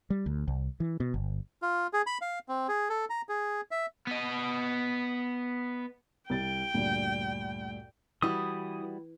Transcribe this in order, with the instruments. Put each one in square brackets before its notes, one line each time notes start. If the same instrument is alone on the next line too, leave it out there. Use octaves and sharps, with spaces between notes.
[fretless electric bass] G3
D2
C2
E3
B2
G1
[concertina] F4
G#4
B5
F5
C4
G#4
A4
A#5
G#4
E5
[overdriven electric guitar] B3 D#5
[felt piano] C2 A6 [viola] G5
[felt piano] D2 G2 A#2
[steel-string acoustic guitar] E3 [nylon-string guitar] G3 E4 F#4 [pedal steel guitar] D#6